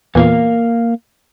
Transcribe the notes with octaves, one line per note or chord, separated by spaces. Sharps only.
E2 A#2 A#3 A#4 F5